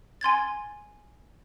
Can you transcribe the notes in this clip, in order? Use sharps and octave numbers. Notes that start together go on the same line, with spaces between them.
G#5 C6 G#6 A6